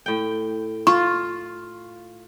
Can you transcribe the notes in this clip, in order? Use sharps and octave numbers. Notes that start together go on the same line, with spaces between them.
A2 G5
F4 C#6